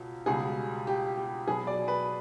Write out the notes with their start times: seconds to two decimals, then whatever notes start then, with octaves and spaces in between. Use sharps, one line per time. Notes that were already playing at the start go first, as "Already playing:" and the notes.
Already playing: C#2 B2
0.26 C#2 B2 G3 G#4
0.87 G4
1.17 G4
1.47 B2 F#3 B3 G#4
1.67 D5
1.88 B4